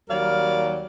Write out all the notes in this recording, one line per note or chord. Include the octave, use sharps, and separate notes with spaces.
D#2 F#3 G3 A#4 D5 F5